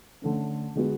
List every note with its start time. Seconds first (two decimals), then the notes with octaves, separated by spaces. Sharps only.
0.22 D3 A3 C#4
0.75 D3 G#3 B3 F#4